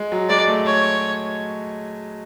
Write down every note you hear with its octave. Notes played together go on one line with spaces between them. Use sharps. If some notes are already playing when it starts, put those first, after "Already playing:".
Already playing: G#3
F#3
G#3 D5
A3
C#5